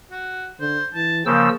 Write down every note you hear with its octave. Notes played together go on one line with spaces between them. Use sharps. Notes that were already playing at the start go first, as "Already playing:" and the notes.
F#4
D3 C5
E3 A5
C#3 F3 A#3 G5 E6